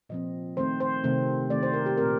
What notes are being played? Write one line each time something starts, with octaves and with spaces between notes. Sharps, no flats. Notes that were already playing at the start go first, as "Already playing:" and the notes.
A#2 F3 C4 D#5
D#3 A3 C4 C5
C5
C3 D#3 A3 C4
D#3 A3 C4 D5
C5
A#4
G4
A#2 A3 C4 A#4